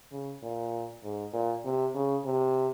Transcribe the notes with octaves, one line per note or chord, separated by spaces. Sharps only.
C#3
A#2
G#2
A#2
C3
C#3
C3